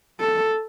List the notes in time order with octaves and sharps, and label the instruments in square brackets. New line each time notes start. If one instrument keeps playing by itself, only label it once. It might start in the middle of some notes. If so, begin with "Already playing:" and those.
[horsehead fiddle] A4